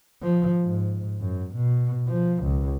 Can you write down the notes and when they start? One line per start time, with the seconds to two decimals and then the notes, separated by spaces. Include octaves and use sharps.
0.22 F3
0.62 G#2
1.21 F#2
1.54 B2
2.08 F3
2.44 C#2